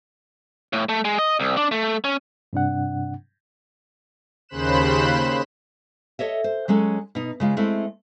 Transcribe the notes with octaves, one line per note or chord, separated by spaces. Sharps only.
A2
A3
G#3
D#5
C2
D4
A3
C#4
G2 C3 D4 F#5
D#2 C#3 C5 B5 F#6 E7
A4 C#5 D#5 E5
C5
F#3 G#3 C#4 A4
B2 D#4
C#3 G#3 F4
G#3 A3 C4 E4